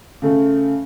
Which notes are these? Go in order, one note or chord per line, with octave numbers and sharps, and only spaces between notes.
C#3 A3